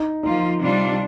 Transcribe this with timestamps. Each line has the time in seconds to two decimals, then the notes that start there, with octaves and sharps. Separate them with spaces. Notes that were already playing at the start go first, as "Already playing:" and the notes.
Already playing: D#4
0.23 F3 A#3 D#4 F4
0.61 C3 G3 D4 F4